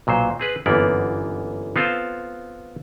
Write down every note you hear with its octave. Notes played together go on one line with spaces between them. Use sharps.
B1 A#2 F#3 C5
C4 G#4 B4
G1 F#2 E3 A#3 B3 D5
B3 C4 F4 A4 C5